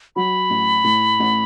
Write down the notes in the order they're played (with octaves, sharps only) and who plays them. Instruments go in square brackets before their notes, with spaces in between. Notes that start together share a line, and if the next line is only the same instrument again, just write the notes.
[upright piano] F#3 [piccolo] B5
[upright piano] A1
A2
A1